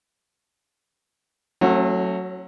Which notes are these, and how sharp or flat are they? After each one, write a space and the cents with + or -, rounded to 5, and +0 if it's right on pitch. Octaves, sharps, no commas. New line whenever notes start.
F#3 +0 A3 +15 C#4 -40